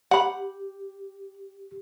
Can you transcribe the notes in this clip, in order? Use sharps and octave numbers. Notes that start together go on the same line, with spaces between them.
G4 F#5 B5